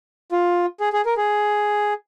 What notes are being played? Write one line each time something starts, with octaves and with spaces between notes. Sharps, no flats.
F4
G#4
G#4
A#4
G#4